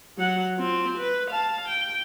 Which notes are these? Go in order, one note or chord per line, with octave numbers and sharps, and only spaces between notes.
F#3 F#5
C4 F4
B4
F5 A5
G5